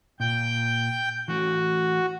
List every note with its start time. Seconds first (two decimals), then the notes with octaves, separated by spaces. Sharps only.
0.20 A#2 F4 G5 G6
1.28 E3 A3 F#4